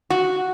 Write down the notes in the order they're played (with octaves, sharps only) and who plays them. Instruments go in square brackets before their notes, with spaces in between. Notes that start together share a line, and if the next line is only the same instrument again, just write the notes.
[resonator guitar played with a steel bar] F#4